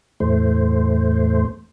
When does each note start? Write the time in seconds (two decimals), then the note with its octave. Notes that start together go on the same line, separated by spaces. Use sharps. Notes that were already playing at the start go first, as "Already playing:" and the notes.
0.20 E2 A2 A3 C5